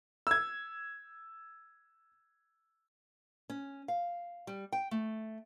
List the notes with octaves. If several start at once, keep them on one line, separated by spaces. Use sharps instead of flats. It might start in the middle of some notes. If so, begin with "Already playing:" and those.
E6 G#6
C#4
F5
G3
G5
A3